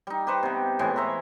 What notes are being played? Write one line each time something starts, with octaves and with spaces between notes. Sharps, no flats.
G3 D#4
G4 B4 C5 C#6
C3 B3
A2 E3 G#3 B3
C5 E5 A#5 C#6